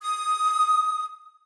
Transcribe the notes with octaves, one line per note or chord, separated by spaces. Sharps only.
D#6